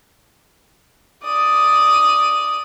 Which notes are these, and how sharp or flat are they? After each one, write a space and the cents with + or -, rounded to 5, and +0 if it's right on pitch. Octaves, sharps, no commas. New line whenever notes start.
D5 +0 D#6 +0